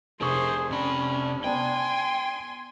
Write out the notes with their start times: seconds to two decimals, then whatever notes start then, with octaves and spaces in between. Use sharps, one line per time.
0.21 F1 D4 G#4 A#4 C5 C#6
0.71 C3 C#4 D4 B5
1.44 B3 C5 G5 G#5 C6